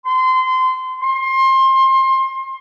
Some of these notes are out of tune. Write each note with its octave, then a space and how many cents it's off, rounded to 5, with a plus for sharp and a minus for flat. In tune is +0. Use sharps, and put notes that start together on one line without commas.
C6 -25
C6 +25